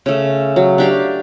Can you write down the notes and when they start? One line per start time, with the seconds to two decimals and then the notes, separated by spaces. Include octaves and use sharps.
0.06 C#3 A3
0.56 F#3
0.78 D4 G4 F5